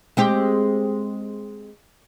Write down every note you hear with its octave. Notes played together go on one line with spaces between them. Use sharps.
G#3 C4 G4